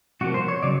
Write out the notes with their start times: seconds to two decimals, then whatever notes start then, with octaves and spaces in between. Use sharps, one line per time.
0.21 C2 C3 F3 A#3 F#4
0.34 C5
0.48 C#5
0.62 C#3 F#3 D5